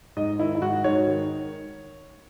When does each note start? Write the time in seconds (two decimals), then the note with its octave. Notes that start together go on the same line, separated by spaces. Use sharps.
0.17 G#2 D#5
0.39 D#3 E4
0.55 E4
0.62 G#2 F#4
0.84 G#2 C#5
1.07 D#3